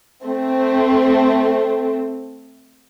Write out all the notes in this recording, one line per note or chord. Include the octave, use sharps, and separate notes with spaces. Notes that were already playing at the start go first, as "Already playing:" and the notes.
A3 C4